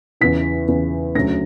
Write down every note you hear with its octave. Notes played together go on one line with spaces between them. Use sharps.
E2 C#3 E3 B6
E2 C#3 E3
D2 C#3 F#3 A#6